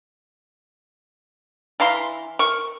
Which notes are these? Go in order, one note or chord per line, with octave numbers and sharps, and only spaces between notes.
E3 F5 A#5 C6
A#4 C#6